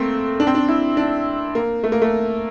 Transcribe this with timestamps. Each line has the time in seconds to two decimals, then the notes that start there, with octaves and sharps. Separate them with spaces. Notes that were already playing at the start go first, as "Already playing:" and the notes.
Already playing: A3 A#3 C4
0.40 D4
0.47 C4
0.55 D4
0.69 E4
0.97 D4
1.55 A#3
1.84 A3
1.92 A#3
2.02 A3